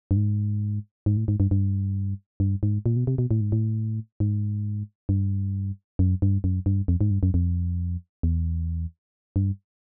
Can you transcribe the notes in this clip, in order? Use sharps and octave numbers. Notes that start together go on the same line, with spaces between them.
G2
G#2
G#2
A2
G#2
G2
G2
G2
G#2
A#2
B2
C3
B2
A2
G#2
A2
G#2
G2
F#2
G2
F#2
G2
F2
G#2
G2
F#2
F2
E2
G2